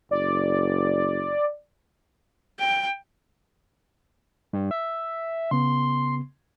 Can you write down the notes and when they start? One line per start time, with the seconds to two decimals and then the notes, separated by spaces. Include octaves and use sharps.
0.11 F#1 D5
2.60 G5
4.53 G2
4.71 E5
5.51 C#3 B3 C6